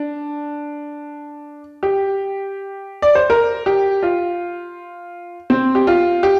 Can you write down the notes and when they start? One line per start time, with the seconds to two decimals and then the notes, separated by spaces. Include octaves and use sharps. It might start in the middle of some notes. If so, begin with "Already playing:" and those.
Already playing: D4
1.83 G4
3.02 D5
3.15 C5
3.30 A#4
3.66 G4
4.03 F4
5.50 C4
5.75 G4
5.87 F4
6.23 G4